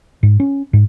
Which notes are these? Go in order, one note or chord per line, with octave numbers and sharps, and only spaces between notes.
G#2
C#4
G#2